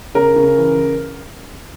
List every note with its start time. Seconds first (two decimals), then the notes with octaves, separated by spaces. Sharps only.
0.15 C#3 A#4
0.36 C#3
0.58 E3